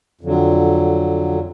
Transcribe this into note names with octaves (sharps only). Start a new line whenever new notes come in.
F2 D3 F#3